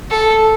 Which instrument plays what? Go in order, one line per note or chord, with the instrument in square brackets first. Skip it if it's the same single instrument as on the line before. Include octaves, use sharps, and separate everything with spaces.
[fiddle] A4